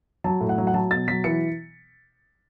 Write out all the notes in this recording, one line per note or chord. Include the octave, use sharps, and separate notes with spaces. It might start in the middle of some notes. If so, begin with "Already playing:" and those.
F#3 A5
A2
F#5
F#3
F#5
F#3 A5
B2 A6
F#3 B6
E3 C#7